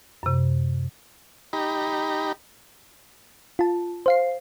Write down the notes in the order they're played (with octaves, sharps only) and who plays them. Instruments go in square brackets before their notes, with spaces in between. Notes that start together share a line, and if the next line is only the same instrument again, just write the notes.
[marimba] F#2 C3
[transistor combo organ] D#4 G4 A#5 B5
[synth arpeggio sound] F4 A5
C5 F5 C7